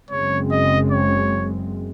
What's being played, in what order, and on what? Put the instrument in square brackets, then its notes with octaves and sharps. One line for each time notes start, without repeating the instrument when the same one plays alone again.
[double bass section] F#1 F#2 C#3 G#3 C4 [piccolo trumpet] C#5
[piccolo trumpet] D#5
C#5